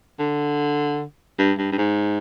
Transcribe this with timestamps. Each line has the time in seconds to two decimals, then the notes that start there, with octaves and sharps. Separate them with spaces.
0.19 D3
1.39 G2
1.58 G2
1.72 G2
1.78 G#2